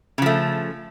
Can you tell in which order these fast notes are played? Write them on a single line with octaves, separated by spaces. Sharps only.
C#3 F3 A3